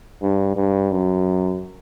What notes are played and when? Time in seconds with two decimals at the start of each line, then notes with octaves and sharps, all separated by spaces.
0.22 G2
0.56 G2
0.91 F#2